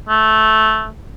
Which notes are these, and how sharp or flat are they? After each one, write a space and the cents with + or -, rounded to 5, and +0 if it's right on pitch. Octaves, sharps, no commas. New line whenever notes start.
A3 -10